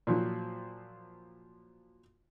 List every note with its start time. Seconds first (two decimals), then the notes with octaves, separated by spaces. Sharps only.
0.07 A#2 F3 F#3